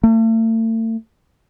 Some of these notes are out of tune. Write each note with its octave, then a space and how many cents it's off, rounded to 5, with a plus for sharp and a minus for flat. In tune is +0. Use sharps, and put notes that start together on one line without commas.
A3 +40